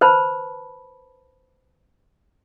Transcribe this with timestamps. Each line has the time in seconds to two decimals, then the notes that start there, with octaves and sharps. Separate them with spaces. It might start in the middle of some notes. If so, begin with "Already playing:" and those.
0.01 B4 C5 A5 B5